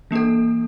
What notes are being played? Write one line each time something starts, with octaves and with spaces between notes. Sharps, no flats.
E3 A#3 D4 A4